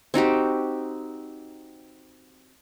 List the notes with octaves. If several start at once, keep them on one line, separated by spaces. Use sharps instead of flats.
C4 D#4 F#4 G4